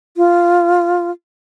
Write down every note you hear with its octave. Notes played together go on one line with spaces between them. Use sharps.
F4